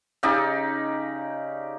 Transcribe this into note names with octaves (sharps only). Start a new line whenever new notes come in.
C#3 D#4 G4 D5